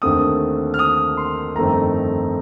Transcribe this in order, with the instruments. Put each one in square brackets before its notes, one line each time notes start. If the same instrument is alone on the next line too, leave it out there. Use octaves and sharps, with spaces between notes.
[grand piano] D#2 D3 A3 C4 D#6
F6
D#6
C6
G1 F2 D#3 A3 C4 A#5